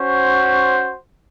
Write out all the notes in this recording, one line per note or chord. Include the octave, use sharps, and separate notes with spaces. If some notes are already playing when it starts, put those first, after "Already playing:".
Already playing: C#4 F#4 C5